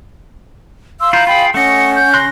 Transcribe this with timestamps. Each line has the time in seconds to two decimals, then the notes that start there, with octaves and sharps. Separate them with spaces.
1.00 F5 C6 E6
1.13 E4 F4 A#5 G6
1.27 F4 G#4 G5 B5
1.54 A3 C#4 D#5 F#5 C#7
1.95 G6
2.14 C#3 C6 F#6 A#6